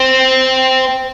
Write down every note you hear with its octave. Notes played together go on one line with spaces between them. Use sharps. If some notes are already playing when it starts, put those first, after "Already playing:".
Already playing: C4